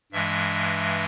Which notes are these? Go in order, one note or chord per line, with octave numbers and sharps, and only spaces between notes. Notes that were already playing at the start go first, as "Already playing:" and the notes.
G2 E3 G#3 E5